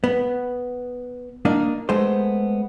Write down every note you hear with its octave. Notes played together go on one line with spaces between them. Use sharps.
B3
A#3 D4 D#4
G#3 A3 B3 C5